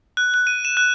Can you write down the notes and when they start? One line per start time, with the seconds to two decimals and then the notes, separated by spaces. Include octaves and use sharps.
0.17 F#6
0.34 F#6
0.47 D#7
0.65 E7
0.77 F#6